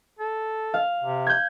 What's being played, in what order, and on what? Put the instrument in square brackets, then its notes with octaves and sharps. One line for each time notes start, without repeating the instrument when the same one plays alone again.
[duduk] A4
[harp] F5
[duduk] C3
[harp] G6 G#6